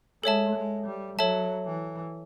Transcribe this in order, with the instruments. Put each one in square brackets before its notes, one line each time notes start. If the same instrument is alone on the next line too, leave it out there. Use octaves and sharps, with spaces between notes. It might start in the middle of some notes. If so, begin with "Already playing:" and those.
[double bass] G#3 [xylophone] A4 C#5 E5 A5
[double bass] G#3
G3
[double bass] F#3 [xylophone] A4 C#5 E5 A5
[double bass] E3